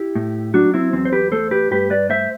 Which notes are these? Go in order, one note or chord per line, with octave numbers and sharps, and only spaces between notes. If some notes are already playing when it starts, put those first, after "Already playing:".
Already playing: E4 G4
A2
F#3 D4 F#4
C4 E4
E2 C4
C5
G4 B4
A3 A4 C5
G4 B4
G2 G4 B4
B4 D5
A3 C5 E5